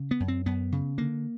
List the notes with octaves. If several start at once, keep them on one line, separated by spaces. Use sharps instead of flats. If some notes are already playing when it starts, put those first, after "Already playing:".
Already playing: C#3
B3
F#2
C4
F#2 B3
C#3
D3 A#3